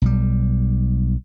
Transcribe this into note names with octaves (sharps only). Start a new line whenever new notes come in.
B1 G3